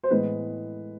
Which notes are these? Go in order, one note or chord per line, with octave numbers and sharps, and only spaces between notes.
C5
A2 E3 G#3 B3 B4